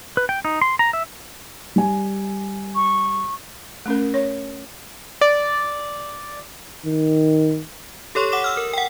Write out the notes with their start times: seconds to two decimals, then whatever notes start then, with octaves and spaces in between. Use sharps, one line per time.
0.17 B4
0.29 G5
0.45 D#4
0.62 C6
0.79 A#5
0.93 E5
1.76 G3 G#5
2.75 C#6
3.86 A3 C#4 A#4
4.14 C#5
5.21 D5
6.86 D#3
8.15 G4 A4 C#5 C6 C#6
8.32 F#5 D6 E7
8.44 E6 F6
8.57 A#4
8.73 F#5 G5